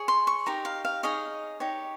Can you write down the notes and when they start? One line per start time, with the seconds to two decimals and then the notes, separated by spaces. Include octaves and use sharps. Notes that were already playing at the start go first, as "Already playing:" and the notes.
Already playing: G#4 C#5
0.08 C6
0.27 C#6
0.46 D#4 G4 A#4 A#5
0.65 F5
0.85 F5
1.03 D#4 G#4 C#5 D#5
1.60 D#4 G4 C#5